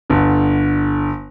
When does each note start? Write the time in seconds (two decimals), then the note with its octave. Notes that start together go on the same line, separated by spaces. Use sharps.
0.10 G1 D3